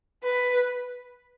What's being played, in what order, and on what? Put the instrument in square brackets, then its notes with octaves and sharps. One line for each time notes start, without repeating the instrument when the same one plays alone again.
[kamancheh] B4